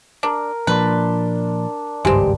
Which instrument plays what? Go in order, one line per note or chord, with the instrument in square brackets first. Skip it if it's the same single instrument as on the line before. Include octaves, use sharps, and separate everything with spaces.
[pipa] D4 [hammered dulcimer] A#4
[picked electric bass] A#2 F3 A#3 [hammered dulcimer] D4 C6 [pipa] B4
[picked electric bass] G#1 C#2 [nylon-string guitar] G2 G4 [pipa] G#3 C4